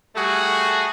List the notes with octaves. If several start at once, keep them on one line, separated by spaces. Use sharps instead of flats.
G3 A3 F#4 G#4